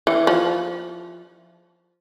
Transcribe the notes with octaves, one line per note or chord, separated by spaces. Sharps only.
E3
F3